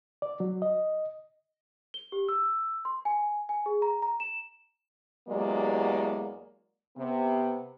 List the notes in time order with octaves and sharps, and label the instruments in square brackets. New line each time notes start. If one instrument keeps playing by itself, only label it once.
[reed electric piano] D5
F#3
D#5
[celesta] G7
G4
E6
C6
G#5
G#5
G#4
A#5
A#5
E7
[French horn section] E2 F#3 G#3 A#3 G4 D5
C3 B3